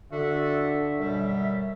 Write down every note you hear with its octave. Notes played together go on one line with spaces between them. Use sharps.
D3 D4 F#4 A4 E5
F#2 B2 G3